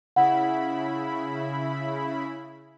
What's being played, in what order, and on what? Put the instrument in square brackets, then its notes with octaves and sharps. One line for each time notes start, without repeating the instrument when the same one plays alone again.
[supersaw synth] C#3 E4 B5 [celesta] F#5